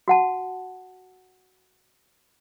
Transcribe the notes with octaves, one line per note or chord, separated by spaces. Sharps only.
F#4 F#5 A5